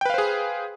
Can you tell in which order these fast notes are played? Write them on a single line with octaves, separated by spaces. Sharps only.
G5 B4 F5 C5 G#4